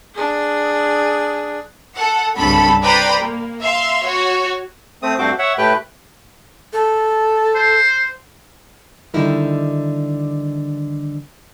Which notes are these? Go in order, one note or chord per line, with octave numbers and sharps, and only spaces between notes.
D4 G#4
A4 F#5
C2 G2 C#3 A4 B5
B4 C5 D5 G5 A#5 B5
A#3
E5 F5 C6
F#4 C#5
A3 C4 D#6
G2 A3 C4 F#4 C5 D6
C#5 E5 F#5
A2 A3 G4 B4 G5 F#6
A4
C5
D3 D#3 G3 D#4 E4 A#4